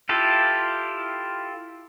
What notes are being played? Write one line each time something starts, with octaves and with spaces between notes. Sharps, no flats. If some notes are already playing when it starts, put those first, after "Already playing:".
E4 F4 G4 A4